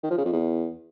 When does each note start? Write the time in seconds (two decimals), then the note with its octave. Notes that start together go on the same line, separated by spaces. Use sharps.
0.03 D#3
0.10 F3
0.18 C#3
0.25 F2
0.32 E2